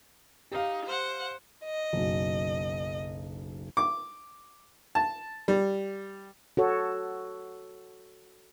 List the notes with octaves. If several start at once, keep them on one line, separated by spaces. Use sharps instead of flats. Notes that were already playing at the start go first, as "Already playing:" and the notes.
D#4 G4 F5
C5 F#5
D#5
F#1 B1
D6
A5
G3
F#4 A4 C#5